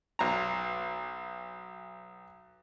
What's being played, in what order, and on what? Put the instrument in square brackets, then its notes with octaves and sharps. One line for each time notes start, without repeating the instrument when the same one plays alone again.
[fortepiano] B1 A#5